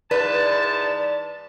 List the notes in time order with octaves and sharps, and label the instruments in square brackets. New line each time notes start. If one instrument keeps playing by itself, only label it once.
[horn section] G#2 E3 A5 [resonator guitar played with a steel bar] B4 [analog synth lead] D5